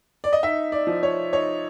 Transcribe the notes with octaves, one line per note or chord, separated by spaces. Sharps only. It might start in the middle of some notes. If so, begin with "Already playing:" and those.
D5
D#5
D#4 E5
D5
F3
C#5
D#4 C#5